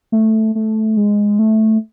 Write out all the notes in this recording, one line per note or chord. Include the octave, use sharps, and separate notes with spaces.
A3
A3
G#3
A3